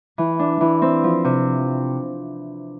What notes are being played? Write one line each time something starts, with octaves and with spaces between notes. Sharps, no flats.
E3
D4
E3
C4
F3
C3